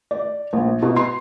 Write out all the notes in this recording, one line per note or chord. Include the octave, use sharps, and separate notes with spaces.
D5
A#1
B2
C6